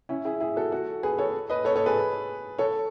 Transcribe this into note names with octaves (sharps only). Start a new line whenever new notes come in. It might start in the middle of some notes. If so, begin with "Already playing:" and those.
C#4 E4
E4 G#4
E4 G#4
F#4 A4
F#4 A4
G#4 B4
A4 C#5
B4 D#5
A4 C#5
A4 C#5
G#4 B4
A4 C#5